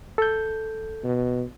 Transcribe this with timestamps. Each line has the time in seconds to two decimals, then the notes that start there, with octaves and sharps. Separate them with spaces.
0.18 A4 G6
1.04 B2